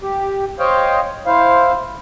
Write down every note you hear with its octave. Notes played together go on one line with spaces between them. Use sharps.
G4
C5 C#5 D#5 F5 G5
E4 C5 F5